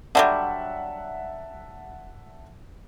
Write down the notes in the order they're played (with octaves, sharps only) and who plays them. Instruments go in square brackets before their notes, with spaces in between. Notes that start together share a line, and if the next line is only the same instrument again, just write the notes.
[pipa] D3 F#3 G3 [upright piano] E5 F#5 A5